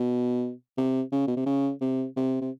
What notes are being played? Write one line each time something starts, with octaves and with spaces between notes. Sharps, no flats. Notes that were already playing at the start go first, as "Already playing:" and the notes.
Already playing: B2
C3
C#3
B2
C3
C#3
C3
C3
C3